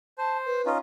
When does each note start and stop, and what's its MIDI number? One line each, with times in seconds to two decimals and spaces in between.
0.18 0.61 72
0.18 0.37 81
0.45 0.68 71
0.66 0.78 61
0.66 0.78 63
0.66 0.78 65